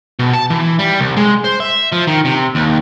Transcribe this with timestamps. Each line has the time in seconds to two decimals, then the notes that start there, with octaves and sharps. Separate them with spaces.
0.19 B2
0.33 A5
0.50 E3
0.79 G3
0.99 C2
1.17 G#3
1.44 C5
1.60 E5
1.92 F3
2.07 D#3
2.25 C3
2.55 D#2